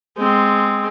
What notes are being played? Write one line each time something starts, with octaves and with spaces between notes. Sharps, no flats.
G#3 C4